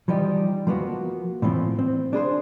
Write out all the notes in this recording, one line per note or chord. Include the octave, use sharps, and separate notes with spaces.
E3 F3 G3 D#4 G4
F3 A#3 B3 F#4
A2 E3 F3 C4
C4
D4 G#4 B4 C5